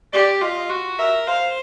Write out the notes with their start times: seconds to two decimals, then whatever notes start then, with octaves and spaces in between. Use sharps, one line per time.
0.13 G4 D5
0.42 F4 D#5
0.70 F#4
0.98 A#4 E5
1.27 C5 F5